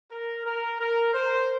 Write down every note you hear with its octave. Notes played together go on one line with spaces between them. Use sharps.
A#4
A#4
A#4
C5